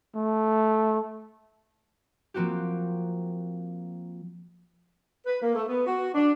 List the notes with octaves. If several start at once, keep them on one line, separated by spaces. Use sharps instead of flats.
A3
F3 A#3 C4 F#4 G4
B4
A#3
A3
B3
F#4
D4